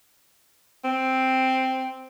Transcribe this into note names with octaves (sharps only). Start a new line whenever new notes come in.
C4